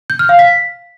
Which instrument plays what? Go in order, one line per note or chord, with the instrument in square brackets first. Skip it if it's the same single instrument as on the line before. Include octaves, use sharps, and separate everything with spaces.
[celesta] G6
F6
F5
B6